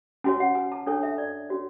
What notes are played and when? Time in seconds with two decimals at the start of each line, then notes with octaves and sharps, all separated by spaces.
0.24 C#4 F#4 C#5 G#5
0.40 F#5
0.55 G#5
0.72 A5
0.87 D4 A4 C#5 G#5
1.03 E5
1.18 D5
1.49 C#4 F#4 C#5